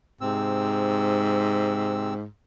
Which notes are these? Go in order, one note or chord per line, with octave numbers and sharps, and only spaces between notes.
G#2 C3 C4 E6